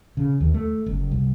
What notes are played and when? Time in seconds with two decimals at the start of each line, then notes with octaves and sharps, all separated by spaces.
0.17 C#3
0.40 D#2
0.54 A3
0.86 F#1
1.11 C2